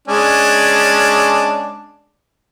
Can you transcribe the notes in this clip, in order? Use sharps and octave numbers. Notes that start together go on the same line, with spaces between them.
G#3 C#4 D4